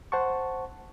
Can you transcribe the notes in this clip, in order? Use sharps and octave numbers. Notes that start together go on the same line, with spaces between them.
C5 F#5 A5 C#6